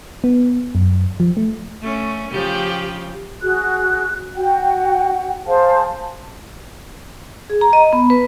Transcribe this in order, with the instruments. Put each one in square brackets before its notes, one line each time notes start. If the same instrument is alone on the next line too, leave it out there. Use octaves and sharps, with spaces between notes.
[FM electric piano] B3
F#2
F3
A3
[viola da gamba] A3 C#4
C#3 F3 G4
[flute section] F#4 G#4 F#6
F#4 F#5 G5
G#4 C5 F5 A5
[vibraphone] G#4
A#5
D#5
B3
B4